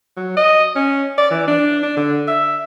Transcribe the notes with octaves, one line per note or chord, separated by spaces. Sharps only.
F#3
D#5
C#4
D5
E3
D4
D4
D3
E5